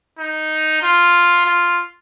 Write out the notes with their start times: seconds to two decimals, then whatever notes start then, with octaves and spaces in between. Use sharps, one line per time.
0.19 D#4
0.82 F4
1.46 F4